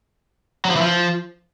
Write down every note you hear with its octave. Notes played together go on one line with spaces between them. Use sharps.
F#3
F3
E3
F3